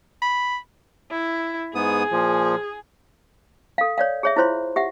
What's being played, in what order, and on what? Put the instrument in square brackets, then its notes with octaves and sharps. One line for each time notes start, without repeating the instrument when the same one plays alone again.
[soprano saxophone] B5
[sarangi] E4
[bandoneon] G#2 B3 D#6 [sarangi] G#4
[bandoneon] A#2 F3
[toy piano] A4 F5
C#5 D5 F5
G#4 C#5 E5
E4 F4 C5 C#5 C6
G4 E5 F#5